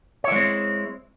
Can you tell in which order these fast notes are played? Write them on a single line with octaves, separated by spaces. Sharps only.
C#5 E4 G#3 C4